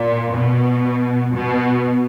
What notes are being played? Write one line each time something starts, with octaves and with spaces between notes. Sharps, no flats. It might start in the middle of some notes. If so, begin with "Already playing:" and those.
Already playing: A#2
B2
B2